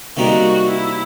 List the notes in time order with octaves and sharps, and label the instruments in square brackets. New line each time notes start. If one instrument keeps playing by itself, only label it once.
[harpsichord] C3 D#3 G3 A#3 D#4 [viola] F#4
[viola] E4